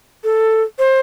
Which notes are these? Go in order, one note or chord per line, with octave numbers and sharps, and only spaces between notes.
A4
C5